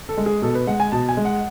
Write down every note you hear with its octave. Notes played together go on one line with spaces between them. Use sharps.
A4
G#3
G#4
B2 A4
B4
G#3 F#5
G#5
B2 A5
G#5
G#3
F#5